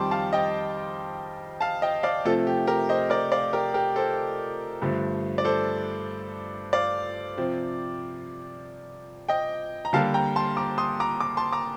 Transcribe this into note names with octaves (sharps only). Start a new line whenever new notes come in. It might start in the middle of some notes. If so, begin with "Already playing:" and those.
Already playing: F2 D#3 G3 A5 C6 D6
F5 A5
D#5 G5
F5 A5
D#5 G5
D5 F5
C3 F3 A3 F4 A4
G4
G4 A#4
C5 D#5
A#4 D5
D5 F5
G4 A#4
G4 A#4
A4 C5
G2 D3 F3 A3
D5
A4 C5
D5 F5
C3 F3 C4
D#5 G5
A#5
D3 G3 A#3 F5 A5
G5 A#5
A5 C6
A#5 D6
C6 D#6
A#5 D6
A#5 D6
A5 C6
A#5 D6